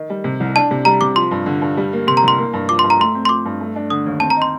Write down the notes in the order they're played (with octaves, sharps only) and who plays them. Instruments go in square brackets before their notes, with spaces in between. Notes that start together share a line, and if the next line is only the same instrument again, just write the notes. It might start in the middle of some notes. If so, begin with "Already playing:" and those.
Already playing: [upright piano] D#3
G3
C3
C2
[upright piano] D4 [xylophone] A5
[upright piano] C3
[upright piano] G3 [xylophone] A#5
[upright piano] C3 [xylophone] D6
[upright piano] F3 [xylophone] C6
[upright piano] G2
D3
G2
G3
A#3
[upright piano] C3 [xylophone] C6
[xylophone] A#5
[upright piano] C2 [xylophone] C6
[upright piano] A#3
G2
[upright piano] F3 [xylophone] D6
[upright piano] G2 [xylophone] C6
[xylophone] A#5
[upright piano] A3 [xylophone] C6
[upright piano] C4
[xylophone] C6
[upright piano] F3 [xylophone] D6
[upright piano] G2
A3
D4
[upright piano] D3 [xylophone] D#6
[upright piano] D#2
[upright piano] C4 [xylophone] A5
[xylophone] A#5
[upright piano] D#4
[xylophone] C6